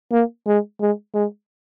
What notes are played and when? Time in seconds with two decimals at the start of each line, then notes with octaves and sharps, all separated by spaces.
0.12 A#3
0.47 G#3
0.80 G#3
1.14 G#3